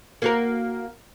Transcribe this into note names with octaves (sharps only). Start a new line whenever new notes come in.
A#3 F#4 A#4